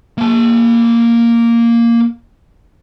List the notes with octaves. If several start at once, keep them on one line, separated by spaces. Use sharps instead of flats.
A#3 A5